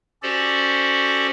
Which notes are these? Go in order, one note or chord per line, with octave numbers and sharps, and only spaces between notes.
C#4 F#4 G4 A4 C5 D5